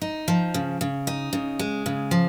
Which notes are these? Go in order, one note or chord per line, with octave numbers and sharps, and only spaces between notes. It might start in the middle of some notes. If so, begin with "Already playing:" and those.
D#4
F3
C#3
C#3
D#4
C#3
G#3
C#3
F3